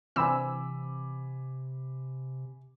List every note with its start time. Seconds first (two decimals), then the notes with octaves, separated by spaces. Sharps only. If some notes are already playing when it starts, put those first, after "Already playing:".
0.16 C3 E3 C4 G#5 B5 D6 E6